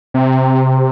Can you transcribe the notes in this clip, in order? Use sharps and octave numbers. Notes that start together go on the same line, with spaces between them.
C3